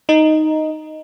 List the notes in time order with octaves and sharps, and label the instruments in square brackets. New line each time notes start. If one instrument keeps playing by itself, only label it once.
[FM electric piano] D#4